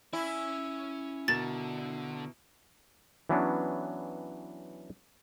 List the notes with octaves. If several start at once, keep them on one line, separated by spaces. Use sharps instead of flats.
C#4 E4 G#5
B2 D3 A#4 A6 E7
E3 F#3 B3 C#4 D4